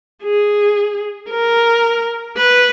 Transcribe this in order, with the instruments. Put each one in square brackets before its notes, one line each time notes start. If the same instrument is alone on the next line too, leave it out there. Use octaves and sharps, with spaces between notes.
[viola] G#4
A#4
B4